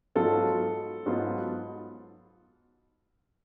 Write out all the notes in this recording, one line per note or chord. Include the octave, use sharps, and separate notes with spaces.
G#2 F#3 B3 F4 A4
G#2 F#3 B3 F4